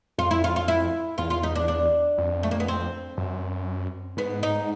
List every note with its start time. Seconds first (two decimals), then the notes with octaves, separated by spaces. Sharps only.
0.18 F2 F4
0.31 E4
0.44 F4
0.56 F4
0.68 E4
1.18 E2 F4
1.30 F4
1.43 D#4
1.55 D4
1.68 D4
2.18 F2
2.43 A3
2.51 A#3
2.60 B3
2.68 C4
3.18 F#2
4.17 G#2 B3
4.43 D#4